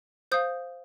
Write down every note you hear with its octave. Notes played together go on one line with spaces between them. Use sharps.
C5 F5 D#6 G6